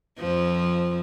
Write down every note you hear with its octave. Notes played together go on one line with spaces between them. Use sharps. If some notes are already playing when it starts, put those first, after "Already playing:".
F2 F3